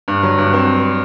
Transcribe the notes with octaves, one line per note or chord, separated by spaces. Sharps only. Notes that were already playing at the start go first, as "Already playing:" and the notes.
G2
F#3
G2
C4